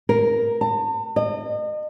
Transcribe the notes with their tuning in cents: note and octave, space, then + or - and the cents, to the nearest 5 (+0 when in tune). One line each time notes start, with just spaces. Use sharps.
A#4 +5
A5 +40
D#5 -35